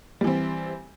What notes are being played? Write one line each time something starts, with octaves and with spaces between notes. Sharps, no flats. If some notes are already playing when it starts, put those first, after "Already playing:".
E3 G3 C4